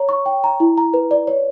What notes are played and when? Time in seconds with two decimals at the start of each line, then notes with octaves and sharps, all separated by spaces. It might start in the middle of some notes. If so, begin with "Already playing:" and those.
Already playing: C#5 A#5
0.09 C#6
0.26 G5
0.44 A#5
0.60 E4
0.78 A#5
0.94 B4
1.11 D5
1.27 C#5